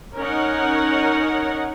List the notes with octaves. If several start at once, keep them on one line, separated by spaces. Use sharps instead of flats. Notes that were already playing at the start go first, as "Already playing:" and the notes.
C#4 D#4 A#4 C#5 F#5